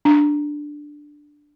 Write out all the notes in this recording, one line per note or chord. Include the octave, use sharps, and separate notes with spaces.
D4